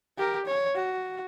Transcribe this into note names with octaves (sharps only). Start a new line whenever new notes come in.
G4 A#4
C#5
F#4